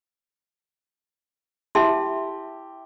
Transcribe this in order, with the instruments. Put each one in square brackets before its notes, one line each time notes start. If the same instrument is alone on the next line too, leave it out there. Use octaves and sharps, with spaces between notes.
[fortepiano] E4 G4 [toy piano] E5 A5 C6